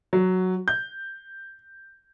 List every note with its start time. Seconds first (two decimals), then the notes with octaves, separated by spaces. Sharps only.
0.13 F#3
0.68 G6